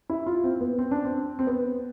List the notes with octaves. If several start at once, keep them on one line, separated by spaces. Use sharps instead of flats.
E4
F4
C4
B3
C4
D4
C4
C4
B3